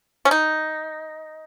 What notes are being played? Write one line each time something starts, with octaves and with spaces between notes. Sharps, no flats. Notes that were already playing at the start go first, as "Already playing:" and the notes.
C#4
D#4